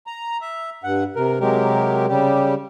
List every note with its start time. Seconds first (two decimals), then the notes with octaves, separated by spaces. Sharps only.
0.07 A#5
0.41 E5
0.84 G2 F#5
1.16 C3 A#4
1.40 C3 F#3 G#3 G4 A#4
2.08 C#3 G3 G4